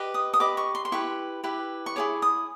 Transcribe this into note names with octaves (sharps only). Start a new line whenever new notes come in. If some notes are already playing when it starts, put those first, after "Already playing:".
Already playing: G4 B4 D#5
D#6
D#6
G4 B4 D#5 D6
C#6
C6
C6
E4 G4 B4 C#6
E4 G4 B4
C#6
E4 G#4 C#5 D6
D#6